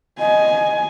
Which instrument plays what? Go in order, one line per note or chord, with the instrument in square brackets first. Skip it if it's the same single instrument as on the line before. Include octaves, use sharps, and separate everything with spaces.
[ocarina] D#5 [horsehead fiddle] G#5